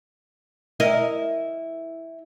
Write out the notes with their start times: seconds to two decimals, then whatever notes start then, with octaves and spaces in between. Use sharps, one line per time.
0.80 E4 A#4 D#5